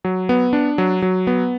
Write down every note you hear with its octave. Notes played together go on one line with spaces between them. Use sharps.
F#3
B3
D4
F#3
F#3
B3